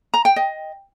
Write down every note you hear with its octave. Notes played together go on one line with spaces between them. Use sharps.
A#5
G5
D#5